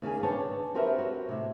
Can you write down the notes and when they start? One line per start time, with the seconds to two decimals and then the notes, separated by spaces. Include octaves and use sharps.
0.02 D#2 C#3 A#3 G#4
0.23 C#3 D4 B4 C#5 G5 A5
0.74 C4 F#4 G4 A#4 B4 E5
0.98 F#4 C#5
1.29 A2 C3